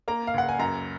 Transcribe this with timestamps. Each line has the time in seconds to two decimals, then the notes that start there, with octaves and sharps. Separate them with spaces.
0.08 A#3 A#5
0.27 F5
0.34 C#2 F#5
0.49 G#5
0.59 F#2 A#5